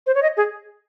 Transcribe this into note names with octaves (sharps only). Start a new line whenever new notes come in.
C5
C#5
D#5
G#4